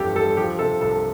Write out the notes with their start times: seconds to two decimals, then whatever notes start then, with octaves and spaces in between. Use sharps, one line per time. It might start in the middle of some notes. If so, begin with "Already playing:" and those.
Already playing: G1 F2 E3 G4 A4
0.15 G3 A4
0.37 F3 G4
0.59 C3 A4
0.81 C2 A4